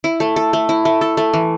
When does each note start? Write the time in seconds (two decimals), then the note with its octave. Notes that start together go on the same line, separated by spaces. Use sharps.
0.04 E4
0.20 A3
0.36 A4
0.53 A3
0.69 E4
0.85 A3
1.01 A4
1.17 A3
1.34 E3